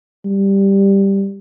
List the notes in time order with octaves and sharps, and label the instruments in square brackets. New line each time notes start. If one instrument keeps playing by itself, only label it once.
[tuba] G3